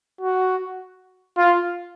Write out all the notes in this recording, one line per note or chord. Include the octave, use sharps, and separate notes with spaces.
F#4
F4